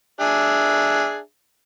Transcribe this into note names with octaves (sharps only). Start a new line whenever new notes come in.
D4 G#4 E5